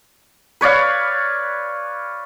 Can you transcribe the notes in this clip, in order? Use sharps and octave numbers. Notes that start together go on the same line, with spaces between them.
B4 C#5 D5 F5